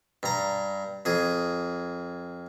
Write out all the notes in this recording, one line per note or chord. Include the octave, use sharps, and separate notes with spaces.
G2 A#5
F2 G#4